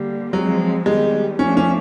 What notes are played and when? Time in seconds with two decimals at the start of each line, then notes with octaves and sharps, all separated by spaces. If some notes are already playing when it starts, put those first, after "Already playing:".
Already playing: D3 G3 A#3
0.32 F3 F#3 G#3 C4
0.86 D#3 G3 G#3 B3
1.39 F3 A3 C#4 D4
1.57 C#4